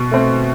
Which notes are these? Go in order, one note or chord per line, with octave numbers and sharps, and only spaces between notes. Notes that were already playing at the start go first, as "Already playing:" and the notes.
Already playing: B2
A3 C4